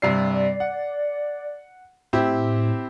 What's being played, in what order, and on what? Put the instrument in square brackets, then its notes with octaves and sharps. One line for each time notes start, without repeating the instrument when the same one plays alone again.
[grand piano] G2 C3 C7 [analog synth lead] D5
[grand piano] F#5
[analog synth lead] A2 [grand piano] C4 E4 G4